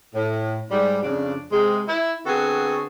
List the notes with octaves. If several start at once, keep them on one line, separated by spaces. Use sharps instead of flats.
A2
G#2 G3
F2 C#3 D4
C3 G#3
E4
D3 B3 C4 F#4 G#4 A4